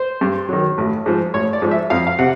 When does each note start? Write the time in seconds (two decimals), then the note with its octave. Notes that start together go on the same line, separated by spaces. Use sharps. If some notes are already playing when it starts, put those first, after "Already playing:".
Already playing: C5
0.21 G2
0.49 D#3 F#3
0.78 A1
1.06 G#2 F3
1.34 A1 C#5
1.53 D5
1.62 G#2 F3
1.71 E5
1.90 F2 F5
2.07 F5
2.19 C3 F#5